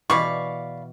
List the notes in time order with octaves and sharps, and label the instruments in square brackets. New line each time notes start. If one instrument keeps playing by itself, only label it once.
[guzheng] B2 E3 [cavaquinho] D5 F5 B5 [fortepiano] C#6